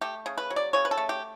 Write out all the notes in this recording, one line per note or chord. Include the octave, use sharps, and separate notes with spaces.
A3 G4
C#3
B4
F#3
D5
C#3 C#5
B4
A4
A3
G4